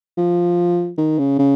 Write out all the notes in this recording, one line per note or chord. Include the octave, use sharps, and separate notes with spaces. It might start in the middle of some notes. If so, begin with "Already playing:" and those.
F3
D#3
C#3
C#3